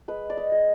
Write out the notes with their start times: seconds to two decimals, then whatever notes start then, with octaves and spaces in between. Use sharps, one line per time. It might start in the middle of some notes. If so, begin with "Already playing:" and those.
0.08 G#3 B4
0.30 D5
0.37 D#5
0.52 G#3